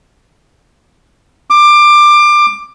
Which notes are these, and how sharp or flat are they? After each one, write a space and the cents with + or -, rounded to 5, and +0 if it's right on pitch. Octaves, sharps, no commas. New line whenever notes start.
D6 +20